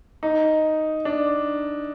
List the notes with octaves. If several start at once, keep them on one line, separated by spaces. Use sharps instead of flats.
D#4
D4